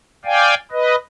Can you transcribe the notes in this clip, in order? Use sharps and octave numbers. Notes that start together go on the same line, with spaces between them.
D5 F5 G5 G#5
B4 D#5